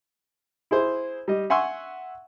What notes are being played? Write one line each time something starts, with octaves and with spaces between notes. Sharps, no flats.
E4 G#4 C5
G3 D#5
E5 F#5 G#5 C6 C#6 E6